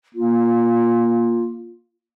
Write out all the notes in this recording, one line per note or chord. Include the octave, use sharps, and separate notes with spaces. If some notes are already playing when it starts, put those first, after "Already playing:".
A#3 F4